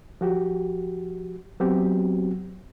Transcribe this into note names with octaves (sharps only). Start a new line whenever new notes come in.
F3 F#4 G4
F#3 B3 C4 F#4 G4